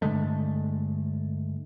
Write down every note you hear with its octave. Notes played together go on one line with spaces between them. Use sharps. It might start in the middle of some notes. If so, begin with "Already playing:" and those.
G2 D3 G#3 A3